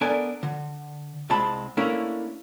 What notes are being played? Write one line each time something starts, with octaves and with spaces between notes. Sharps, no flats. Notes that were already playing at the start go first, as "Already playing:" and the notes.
B3 D4 A4 A#4 D5 G#5
D3
C2 G#3 C4 A5 B5
A3 A#3 C#4 D4 E4 A#4